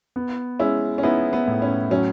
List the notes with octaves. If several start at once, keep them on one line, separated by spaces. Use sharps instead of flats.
B3
G#3 C#4 E4
C#4
B3 D#4 E4
B3
A2
C#4
F#3 C#4